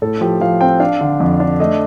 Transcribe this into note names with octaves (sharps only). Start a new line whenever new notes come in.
A2 A4
F3 G4
F3 F5
C4 G5
D4 F5
D3
F2
D4
A3 D#5